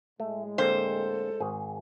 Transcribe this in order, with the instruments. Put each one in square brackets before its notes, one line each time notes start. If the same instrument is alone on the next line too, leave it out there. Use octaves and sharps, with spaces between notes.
[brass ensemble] A2 G#3 [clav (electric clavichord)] A3
[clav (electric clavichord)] D3 A#3 C4 [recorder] A4 [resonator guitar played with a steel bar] C5
[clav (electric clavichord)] G#1 G#4